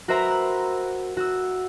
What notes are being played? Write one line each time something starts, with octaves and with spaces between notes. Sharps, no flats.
F#4 A#4 C5 E5 A#5 B5
E6 F#6
F#4 E6